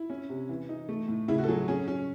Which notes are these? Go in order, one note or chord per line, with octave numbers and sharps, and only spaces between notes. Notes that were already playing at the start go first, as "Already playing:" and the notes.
Already playing: E4
C#4
C3
E3
D#4
A3
A2
C#3 E4
F#4
A4
F#3 G#4
C#4 G#4
C#4